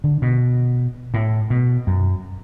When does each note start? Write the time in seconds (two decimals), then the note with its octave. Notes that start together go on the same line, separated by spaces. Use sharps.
0.04 D3
0.22 B2
1.14 A2
1.50 B2
1.87 F#2